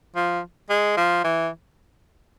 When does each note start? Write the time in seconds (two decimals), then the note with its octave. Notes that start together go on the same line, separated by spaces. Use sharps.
0.16 F3
0.70 G#3
0.97 F3
1.24 E3